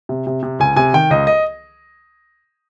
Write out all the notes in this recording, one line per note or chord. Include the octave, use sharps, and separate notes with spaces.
C3
C3
C3
C#2 G#5
C3 G#5
D#3 G5
C#2 D#5
D#5